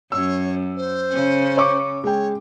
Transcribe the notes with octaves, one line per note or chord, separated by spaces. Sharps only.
F#2 C#5 E6
C5
C#3 C#4
C#5 C#6 D6
G#3 C#5 G5